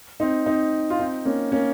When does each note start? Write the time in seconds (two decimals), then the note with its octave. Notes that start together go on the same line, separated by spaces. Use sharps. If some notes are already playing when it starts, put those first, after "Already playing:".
0.20 C4 D#4
0.46 C4 D#4
0.90 F4
0.99 C4 D#4
1.25 A#3 C#4
1.52 A#3 C#4